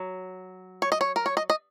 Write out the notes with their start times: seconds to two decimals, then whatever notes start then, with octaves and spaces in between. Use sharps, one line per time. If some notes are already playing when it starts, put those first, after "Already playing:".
Already playing: F#3
0.82 C#5
0.92 D#5
1.01 C#5
1.16 A#4
1.26 C#5
1.37 D#5
1.50 D#5